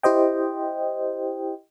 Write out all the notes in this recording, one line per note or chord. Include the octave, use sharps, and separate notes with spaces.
E4 G4 C5 D#5 G5